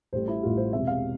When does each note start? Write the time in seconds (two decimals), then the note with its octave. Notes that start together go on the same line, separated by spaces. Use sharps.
0.13 A1 A2 G3 C5
0.28 E4
0.43 A1 A2 G3 F4
0.57 C5
0.72 E1 E2 C3 E5
0.87 F5